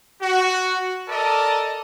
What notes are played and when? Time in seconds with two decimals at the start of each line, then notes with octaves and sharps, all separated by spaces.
0.21 F#4
1.08 A4 A#4 D5 D#5 A5